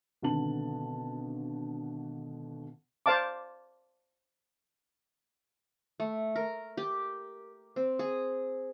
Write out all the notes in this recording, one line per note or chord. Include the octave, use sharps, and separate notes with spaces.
G#1 B2 D3 B3 A5 F#7
C5 D5 F5 A5 D6
A3
A#4
G4
C4
G#4